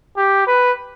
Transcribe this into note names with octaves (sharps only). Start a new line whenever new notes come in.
G4
B4